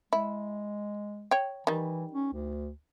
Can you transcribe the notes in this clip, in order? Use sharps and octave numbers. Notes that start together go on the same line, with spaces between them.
G#3 E4
C#5 G5
D#3 E3 G3
C#4
D2